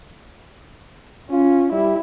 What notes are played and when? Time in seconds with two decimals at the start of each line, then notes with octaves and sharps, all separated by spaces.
1.31 C#4 F4
1.72 G3 E4